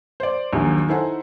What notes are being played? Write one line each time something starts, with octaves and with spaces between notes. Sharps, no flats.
C5 D5
A#1 D#2 F#3
D#4 E4 A4 C5 F#5 G#5